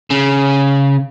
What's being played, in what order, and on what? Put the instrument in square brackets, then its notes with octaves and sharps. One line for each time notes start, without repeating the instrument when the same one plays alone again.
[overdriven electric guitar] C#3